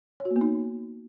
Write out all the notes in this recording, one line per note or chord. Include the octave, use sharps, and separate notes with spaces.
C#5
F#4
A#3
B3
D#4